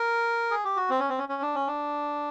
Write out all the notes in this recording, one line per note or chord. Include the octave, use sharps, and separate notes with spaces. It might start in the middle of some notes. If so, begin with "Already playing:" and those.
Already playing: A#4
G#4
G4
F#4
C4
C#4
C4
C#4
C#4
D4
C#4
D4